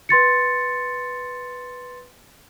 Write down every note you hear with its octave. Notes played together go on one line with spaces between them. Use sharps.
B4 C6 A6 C#7